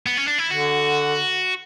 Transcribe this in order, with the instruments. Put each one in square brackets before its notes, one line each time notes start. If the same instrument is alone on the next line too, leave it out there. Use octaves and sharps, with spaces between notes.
[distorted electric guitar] B3
C#4
D4
E4
[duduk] D3 [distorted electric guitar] F#4